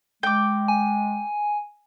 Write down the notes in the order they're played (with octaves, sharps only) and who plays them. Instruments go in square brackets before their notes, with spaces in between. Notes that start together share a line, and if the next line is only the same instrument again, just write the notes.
[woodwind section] G#3 [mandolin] G5 D6
[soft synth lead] G#5